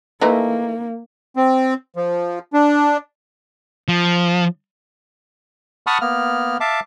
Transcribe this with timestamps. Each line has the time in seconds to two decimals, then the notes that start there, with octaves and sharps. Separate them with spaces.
0.21 E3 A3 A#3 D#4
1.36 C4
1.96 F3
2.53 D4
3.88 F3
5.87 F#5 A5 B5 C#6 D#6 F6
6.01 A#3 B3 F6
6.60 E5 F5 A5 D6